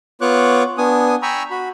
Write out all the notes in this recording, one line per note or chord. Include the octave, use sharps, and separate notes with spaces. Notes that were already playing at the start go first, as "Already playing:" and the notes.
B3 F4 C#5 C#6 D6 F#6
B3 D4 G#5 D#6
G5 G#5 A#5 B5 C#6 E6
F#4 B5